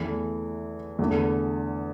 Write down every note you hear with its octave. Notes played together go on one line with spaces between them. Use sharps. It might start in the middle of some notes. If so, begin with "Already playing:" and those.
Already playing: E2 E3 A3
E2 D3 A3